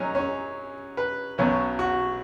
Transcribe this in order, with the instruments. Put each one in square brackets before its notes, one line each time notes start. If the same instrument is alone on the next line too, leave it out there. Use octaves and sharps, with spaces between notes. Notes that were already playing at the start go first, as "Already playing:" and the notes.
Already playing: [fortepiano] F#2 F#3 C#4 D#4
C#4
B4
B1 B2 F#3 C#4
F#4